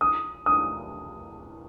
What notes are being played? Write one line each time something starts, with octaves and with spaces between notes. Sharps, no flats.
D#6
D#6